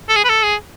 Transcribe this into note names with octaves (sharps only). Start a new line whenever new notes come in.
A4
G#4
B4
A4
G#4